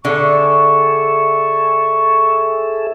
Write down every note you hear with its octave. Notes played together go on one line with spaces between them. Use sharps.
D3 G#4 A4 E5 C#6